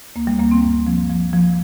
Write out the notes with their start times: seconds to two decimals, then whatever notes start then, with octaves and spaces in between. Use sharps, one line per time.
0.15 D2 A#3
0.27 G3
0.39 D2 A#3
0.51 C4
0.63 G2
0.87 F3
1.10 F3
1.33 F3